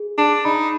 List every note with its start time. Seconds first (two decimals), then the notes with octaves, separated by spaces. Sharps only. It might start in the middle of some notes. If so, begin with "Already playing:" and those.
Already playing: G#4
0.18 D4 G#4
0.45 D#4 B5